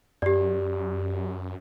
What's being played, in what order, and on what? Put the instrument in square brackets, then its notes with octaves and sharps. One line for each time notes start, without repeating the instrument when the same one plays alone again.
[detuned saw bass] F#2 [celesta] G4 D5